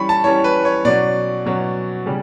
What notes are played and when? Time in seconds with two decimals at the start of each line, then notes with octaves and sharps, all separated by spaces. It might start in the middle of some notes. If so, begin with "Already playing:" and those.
Already playing: E3 G3 C#4 B5 C#6
0.09 A5
0.24 E3 G3 C#4 C#5
0.44 B4
0.65 C#5
0.85 B2 F#3 C#4 D5
1.45 B2 F#3 C#4
2.06 C#3 G3